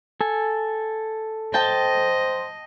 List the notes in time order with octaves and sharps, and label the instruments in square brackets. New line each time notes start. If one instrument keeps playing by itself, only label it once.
[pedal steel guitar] A4 G#5
[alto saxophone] C5 [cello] D#5 [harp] G5 A5